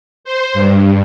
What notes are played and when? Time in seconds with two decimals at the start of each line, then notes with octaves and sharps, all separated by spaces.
0.24 C5
0.54 G2